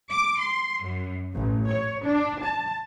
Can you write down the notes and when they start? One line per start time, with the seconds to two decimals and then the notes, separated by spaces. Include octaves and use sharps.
0.11 D6
0.41 C6
0.82 F#2
1.34 A1
1.70 C#5
2.04 D4
2.45 A5